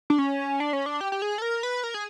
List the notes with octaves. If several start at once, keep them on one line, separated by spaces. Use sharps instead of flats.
D4
C#4
D4
C#4
D4
G4
G4
G#4
A4
A#4
B4
A#4
G#4